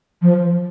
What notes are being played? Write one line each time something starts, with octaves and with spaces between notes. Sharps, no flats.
F3